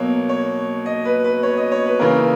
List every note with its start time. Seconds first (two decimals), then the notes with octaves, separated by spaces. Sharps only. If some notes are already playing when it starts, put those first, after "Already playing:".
Already playing: B2 F#3 A#3 C#5
0.29 C#5
0.86 D#5
1.05 B4
1.24 B4
1.43 C#5
1.57 D#5
1.72 C#5
1.86 B4
1.99 C#3 E3 A#3 A#4